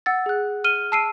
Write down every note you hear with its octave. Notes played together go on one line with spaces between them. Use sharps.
F#5 E6 A6
G#4 F#6
F6 D#7 G7
A5 E6 C7 D7 D#7